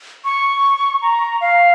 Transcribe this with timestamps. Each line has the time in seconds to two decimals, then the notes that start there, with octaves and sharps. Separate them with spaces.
0.25 C#6
1.02 A#5
1.41 F5